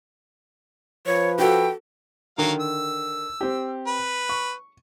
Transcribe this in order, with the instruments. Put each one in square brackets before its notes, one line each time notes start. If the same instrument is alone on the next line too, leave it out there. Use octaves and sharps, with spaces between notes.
[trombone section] F3 B4 [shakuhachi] C#5
[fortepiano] F#4 A4 [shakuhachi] G5
[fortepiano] D3 D#3 [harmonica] F#3 A#4 F5
[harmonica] E6
[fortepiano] C4 G4
[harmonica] B4
[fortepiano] C#6